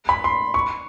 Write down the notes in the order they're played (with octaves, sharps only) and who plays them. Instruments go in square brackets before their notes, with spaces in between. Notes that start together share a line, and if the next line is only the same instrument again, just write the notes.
[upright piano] B5
C6
C#6